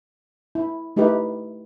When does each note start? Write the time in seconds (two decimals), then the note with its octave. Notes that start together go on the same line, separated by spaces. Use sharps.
0.55 E4
0.96 A3 D#4 E4 G4 B4